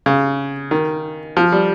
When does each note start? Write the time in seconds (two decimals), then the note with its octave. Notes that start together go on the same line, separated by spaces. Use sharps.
0.06 C#3
0.71 D#3
1.37 F3
1.52 G3